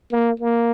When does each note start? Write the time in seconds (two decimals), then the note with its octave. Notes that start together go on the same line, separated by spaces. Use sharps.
0.12 A#3
0.40 A#3